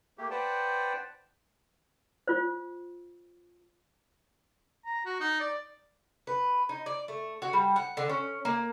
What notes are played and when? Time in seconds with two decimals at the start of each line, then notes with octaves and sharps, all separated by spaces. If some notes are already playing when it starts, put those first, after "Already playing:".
0.18 A3 A#3 G4
0.31 B4 C5 D5 F#5 G5 A5
2.28 F4 C5
4.85 A#5
5.05 F#4
5.20 D#4
5.40 D5
6.27 B4
6.69 D#4
6.86 D5
7.08 A3
7.42 F#4
7.53 G3
7.76 F#5
7.97 D3
8.09 C#4
8.45 A#3